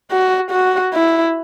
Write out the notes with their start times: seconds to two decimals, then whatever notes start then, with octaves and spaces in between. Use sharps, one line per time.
0.11 F#4
0.51 F#4
0.93 E4